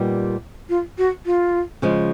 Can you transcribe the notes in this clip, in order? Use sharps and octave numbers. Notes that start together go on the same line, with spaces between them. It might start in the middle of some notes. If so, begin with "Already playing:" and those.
Already playing: A#2 G3 B3 D#4 G4
F4
F#4
F4
C#3 F3 G#3